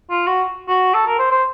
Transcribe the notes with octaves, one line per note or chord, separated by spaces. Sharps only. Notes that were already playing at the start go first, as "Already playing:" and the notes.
F4
F#4
F#4
A4
A#4
C5
C5